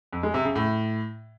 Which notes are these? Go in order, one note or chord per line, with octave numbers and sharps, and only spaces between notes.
F2
G#3
C3
C#3
A2